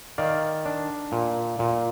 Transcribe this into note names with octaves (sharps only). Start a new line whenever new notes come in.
D#3 D5 F5
D4
A#2
A#2